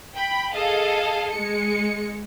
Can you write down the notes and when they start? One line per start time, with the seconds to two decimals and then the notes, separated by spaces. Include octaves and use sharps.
0.15 G5 B5
0.55 G#4 A4 D#5 F5
1.34 G#3 C#7